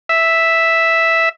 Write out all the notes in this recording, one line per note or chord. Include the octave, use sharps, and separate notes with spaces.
E5